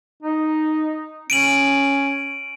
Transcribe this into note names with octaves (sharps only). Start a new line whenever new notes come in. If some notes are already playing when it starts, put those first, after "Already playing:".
D#4
C#4 D7 D#7 F#7